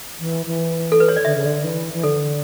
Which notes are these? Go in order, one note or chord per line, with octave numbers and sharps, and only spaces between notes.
E3
E3
A4
B4
C#5
D5
D3 E5
C#3
D3
E3
E3
D3 A4